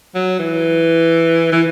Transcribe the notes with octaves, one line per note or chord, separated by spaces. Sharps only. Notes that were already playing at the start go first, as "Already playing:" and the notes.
F#3
E3
E3